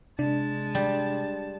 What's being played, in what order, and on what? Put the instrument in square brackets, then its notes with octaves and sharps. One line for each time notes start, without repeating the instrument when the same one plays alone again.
[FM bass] C3 [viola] G#3 A5 [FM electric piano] D4
[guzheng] G3